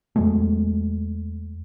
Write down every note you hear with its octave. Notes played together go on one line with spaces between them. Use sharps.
E2 F#3 G#3 A3